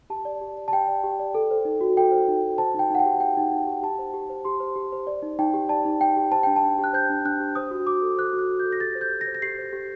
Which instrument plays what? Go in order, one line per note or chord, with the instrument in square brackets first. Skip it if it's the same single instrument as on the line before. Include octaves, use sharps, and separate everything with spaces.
[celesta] G4 A5
D5
G4
D5
A5
G4 G5
D5
G4
D5
A4
C5
D#4
F#4
A4 G5
C5
D#4
F#4
C5 A5
D#4 G5
D#4 F#5
G5
G4
C5 G5
D#4
D#4
G4
G4 A5
C5
G4
C5
G4 C6
C5
G4
C5
D5
D#4
D#4 G5
G4
D5 A5
D#4
D#4 G5
G4
C5 A5
D4 G5
A5
D4
G4
F#6
C5 G6
D4
D4 F#6
G4
C5 D#6
F#4
F#4 D6
A4
C5 F#6
F#4
F#6
F#4
A4 G6
A#6
G4 A6
C5
G6
G4
A#6
C5
A#6
G4 C7
C5
G4